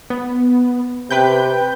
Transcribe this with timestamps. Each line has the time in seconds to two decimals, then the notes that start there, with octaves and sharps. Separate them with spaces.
0.10 B3
1.11 C3 B4 G5 G6